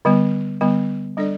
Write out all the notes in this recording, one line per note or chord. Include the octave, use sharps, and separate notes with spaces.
D3 G3 B3
D3 G3 B3
G3 D4 A4 D5